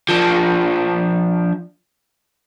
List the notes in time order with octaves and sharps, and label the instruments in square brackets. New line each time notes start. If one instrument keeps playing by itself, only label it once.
[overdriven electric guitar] F3 D4